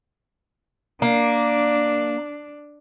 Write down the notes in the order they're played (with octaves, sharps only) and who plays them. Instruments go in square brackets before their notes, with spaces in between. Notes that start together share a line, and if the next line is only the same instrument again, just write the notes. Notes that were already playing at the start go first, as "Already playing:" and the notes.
[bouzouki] A#3 [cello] D4